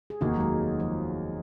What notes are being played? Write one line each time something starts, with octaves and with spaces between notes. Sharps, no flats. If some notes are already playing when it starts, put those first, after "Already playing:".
G#4
F1 D#2 D#3 A#3 D#4 F#4
F#3
G#3
F3